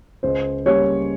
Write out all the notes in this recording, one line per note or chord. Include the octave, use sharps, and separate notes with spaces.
C#2 C5
C#3 G3 A#3 C#5